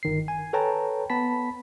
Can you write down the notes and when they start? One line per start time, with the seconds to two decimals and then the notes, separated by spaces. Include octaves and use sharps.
0.03 G1 D#3 C7
0.28 G#5
0.53 A4 B4 C#5 G5 A5 A#5
1.10 B3 A5 B5 B6